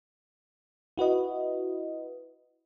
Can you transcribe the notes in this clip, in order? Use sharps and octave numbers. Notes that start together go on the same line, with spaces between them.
E4 F#4 B4 D#5